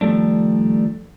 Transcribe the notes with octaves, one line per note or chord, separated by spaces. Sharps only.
D#3 F3 G3 A3 D4